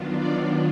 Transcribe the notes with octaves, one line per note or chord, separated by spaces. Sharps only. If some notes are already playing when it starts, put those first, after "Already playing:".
Already playing: D#3 F#3 B3 D4 F4
D5